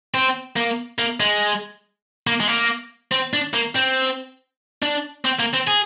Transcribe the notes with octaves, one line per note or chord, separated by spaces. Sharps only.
C4
A#3
A#3
G#3
A#3
G#3
A#3
C4
D4
A#3
C4
D4
C4
A#3
C4
G#4